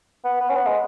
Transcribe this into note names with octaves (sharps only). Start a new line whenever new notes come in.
B3
B3
C#4
B3
G#3